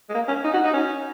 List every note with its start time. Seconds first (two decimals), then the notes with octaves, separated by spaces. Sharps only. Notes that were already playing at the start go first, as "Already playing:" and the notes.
0.09 G#3
0.14 A#3
0.28 C#4
0.44 D#4
0.54 F#4
0.64 D#4
0.73 C#4